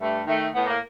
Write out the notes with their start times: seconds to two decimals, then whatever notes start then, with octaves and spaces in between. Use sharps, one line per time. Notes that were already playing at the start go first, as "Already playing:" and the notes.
0.01 G2 A3
0.27 D#3 A3
0.54 A2 B3
0.66 A#3